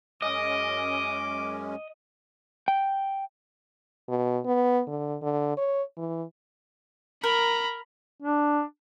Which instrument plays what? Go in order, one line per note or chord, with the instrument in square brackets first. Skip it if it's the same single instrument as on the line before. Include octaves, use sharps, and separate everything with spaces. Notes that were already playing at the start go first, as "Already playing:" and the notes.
[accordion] F#2 G#3 C#4 [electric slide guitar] D#5 [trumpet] D6
[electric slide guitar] G5
[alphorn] B2
B3
D3
D3
C#5
E3
[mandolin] A#4 [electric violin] A#5 B5
[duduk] D4